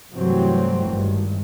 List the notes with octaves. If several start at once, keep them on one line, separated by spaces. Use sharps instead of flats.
G2 C3 E3 F#3 A3 C4
G#1 G2